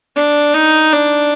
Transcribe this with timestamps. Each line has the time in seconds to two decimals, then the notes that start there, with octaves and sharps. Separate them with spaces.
0.16 D4
0.54 D#4
0.93 D4